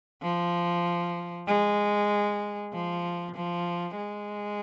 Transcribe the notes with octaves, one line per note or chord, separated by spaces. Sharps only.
F3
G#3
F3
F3
G#3